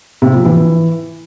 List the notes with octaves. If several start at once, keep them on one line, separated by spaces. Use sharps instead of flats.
C3
F3
E3